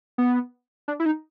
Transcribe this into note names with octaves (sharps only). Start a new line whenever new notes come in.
B3
D4
E4
D#4